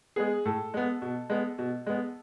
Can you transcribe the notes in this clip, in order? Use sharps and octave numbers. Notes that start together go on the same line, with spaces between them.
G#3 B3 G#4
A2 A4
G#3 B3
B2
G#3 B3
B2
G#3 B3